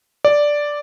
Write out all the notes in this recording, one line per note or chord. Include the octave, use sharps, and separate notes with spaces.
D5